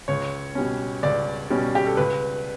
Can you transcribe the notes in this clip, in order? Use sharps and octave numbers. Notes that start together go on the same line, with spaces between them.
C#2 C#5
B2 G3 C#4
C#2 D5
B2 G3 C#4
G4
A4
C#2 B4